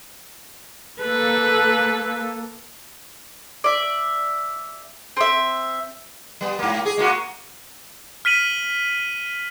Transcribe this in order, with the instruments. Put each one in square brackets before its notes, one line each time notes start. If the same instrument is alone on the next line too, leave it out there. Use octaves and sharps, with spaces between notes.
[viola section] A#3 A4 [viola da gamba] B4
[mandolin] D5 E5
C4 E5
[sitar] G3 B3
G#2 A#3
G#4
G#3 A#3 F#4
[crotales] F6 B6 D#7 F#7